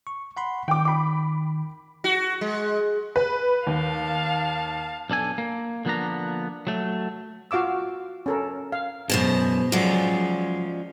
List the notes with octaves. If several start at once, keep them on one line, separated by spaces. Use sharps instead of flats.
C#6
F#5 B5 C6
D#3 G5 D6
B5 D6
F#4
G#3
B4
D#2 F5 A5
B1 D4 A4 G#5
A#3
D3 F3 A#3 B3 D4 A#5
F#3 A3
F4 F#4 F5 D6 E6
C#4 A4 A#4
F5
F#2 B2 G#3 C5 A5
F3 F#3 G#3 C#4 D5